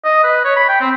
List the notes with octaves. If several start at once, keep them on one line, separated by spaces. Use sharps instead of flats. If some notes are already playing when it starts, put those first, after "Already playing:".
D#5
B4
C#5
B5
G5
C4